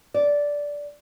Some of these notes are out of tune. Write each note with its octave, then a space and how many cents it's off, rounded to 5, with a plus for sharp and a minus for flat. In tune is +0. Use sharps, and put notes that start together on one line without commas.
D5 -10